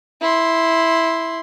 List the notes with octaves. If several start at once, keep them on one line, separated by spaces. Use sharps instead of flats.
E4 C6